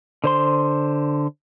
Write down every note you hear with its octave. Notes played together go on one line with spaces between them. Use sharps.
D3 C5 C6